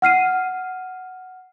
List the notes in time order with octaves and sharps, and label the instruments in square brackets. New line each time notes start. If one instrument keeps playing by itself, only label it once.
[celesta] F#5 F6 C7 D#7